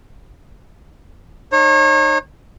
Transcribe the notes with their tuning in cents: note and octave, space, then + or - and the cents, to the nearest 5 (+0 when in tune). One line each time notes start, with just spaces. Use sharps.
D#4 -30 C#5 -35